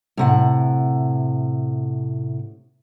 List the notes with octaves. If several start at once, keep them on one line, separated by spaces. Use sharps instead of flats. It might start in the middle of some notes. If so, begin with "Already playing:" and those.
A2 C3 F#5